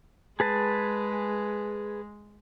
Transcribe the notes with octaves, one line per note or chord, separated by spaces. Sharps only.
G#3 G#4 B4 A5